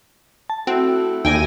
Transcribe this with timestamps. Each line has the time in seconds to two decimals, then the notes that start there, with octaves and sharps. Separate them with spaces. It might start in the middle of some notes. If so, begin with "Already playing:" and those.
0.50 A5
0.67 A3 C4 E4 F#4 A4
1.25 D#2 G5 G#5 A#6